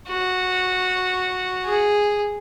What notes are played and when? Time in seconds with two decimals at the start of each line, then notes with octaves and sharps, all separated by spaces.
0.08 F#4
1.65 G#4